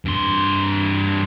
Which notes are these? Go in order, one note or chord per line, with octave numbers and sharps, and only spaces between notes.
G2 C6